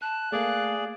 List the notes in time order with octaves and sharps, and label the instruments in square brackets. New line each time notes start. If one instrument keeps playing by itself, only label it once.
[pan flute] A5 [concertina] F#6
[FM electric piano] A3 A#3 [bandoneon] G#4 D5 [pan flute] F5